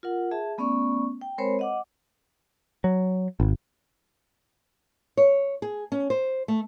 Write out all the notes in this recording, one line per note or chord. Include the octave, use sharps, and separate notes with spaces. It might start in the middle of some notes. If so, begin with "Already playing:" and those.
F4 A#4 F#5
G#4 E5 A5
A3 B3 C#4 D5 C#6
G5
G#3 C4 A#4 C5 C#5 B5
D#5 F#5 D6
F#3
G#1
C#5
G#4
C#4
C5
A3